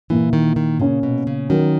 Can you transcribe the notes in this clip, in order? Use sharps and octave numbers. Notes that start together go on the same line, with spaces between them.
A#2 E3 A#3 E4
D#3
D#3
A#2 C#3 A#3 C#4
B2
C#3
D#3 F#3 C#4 F#4 A#4